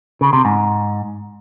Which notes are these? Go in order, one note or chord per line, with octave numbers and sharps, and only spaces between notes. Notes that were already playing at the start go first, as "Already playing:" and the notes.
C#3
C3
G#2